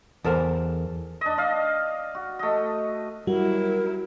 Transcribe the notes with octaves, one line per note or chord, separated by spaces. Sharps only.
E2 A4 A#4 C5
D4 D#5
D5 D#5 F5
F#4
A3 D#5
F#3 G3 E4 F#4 A#4